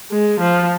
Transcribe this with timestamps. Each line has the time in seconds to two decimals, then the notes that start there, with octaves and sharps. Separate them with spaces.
0.11 G#3
0.40 F3